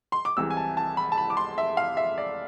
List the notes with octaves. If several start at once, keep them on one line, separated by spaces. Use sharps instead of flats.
C6
D6
C2 C3 E3 G#3 E6
G#5
A5
A5
B5
A5
B5
D6
C6
E5
F5
E5
D5